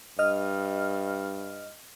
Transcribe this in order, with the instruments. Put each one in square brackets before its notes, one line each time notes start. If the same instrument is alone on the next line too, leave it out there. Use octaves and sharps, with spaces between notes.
[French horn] G2 [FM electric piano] D#5 F6